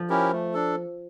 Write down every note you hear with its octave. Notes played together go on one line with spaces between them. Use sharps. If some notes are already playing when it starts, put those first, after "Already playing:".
Already playing: F3
C#4 E4 G4 A#4
A3
D4 A4